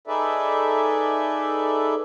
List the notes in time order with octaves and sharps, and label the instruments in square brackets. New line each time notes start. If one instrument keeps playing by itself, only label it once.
[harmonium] D#4 G#4 A4 B4 D5 E5